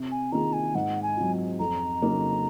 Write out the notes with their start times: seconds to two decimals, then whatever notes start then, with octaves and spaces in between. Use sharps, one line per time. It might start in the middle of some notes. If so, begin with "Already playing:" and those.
Already playing: C3
0.11 G#5
0.32 D#3 A#3 F4 G#4 A#5
0.53 G#5
0.75 G#2 F#5
1.03 G#5
1.17 F#3 C4 F4
1.59 F2 A#5
2.02 C#3 F#3 A#3 D#4